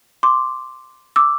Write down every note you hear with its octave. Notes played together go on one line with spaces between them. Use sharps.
C6 D6
D6 E6